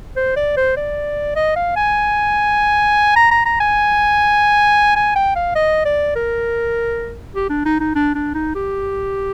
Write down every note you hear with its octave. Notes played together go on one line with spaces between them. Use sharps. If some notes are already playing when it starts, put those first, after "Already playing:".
C5
D5
C5
D5
D#5
F5
G#5
A#5
A#5
A#5
G#5
G#5
G5
F5
D#5
D5
A#4
G4
D4
D#4
D#4
D4
D4
D#4
G4